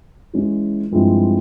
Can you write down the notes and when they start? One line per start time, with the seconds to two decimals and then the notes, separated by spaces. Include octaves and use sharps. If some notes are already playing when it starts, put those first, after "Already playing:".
0.33 E3 G#3 C#4
0.91 G2 F3 G#3 C4 E4